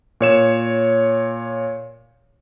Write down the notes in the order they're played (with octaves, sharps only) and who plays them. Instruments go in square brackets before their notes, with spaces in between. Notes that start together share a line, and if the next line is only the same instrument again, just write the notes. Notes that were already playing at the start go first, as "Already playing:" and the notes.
[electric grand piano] A#2 C#5 E7